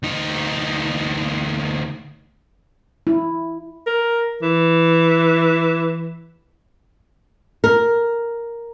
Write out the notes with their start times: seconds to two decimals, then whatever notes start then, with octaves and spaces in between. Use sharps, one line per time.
0.03 D2 D#4
3.07 E4
3.87 A#4
4.42 E3
7.64 A#4